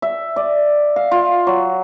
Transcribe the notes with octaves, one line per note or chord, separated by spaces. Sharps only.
E5
D5
F5
F4
F#3